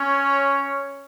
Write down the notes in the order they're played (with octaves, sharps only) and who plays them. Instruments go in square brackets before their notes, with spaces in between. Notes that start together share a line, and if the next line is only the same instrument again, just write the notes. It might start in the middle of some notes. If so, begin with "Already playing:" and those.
Already playing: [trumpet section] C#4 C#5